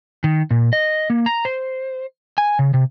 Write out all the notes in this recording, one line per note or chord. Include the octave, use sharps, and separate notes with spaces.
D#3
A#2
D#5
A#3
A#5
C5
G#5
C#3
C3